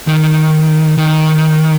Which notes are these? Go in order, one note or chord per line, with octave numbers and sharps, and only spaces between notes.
D#3
D#3